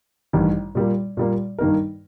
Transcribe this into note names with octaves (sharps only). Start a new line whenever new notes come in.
A1 G2 D#3 G3
A#2 G3 A#3
A#2 G3 A#3
G2 D#3 A#3 D#4 A#4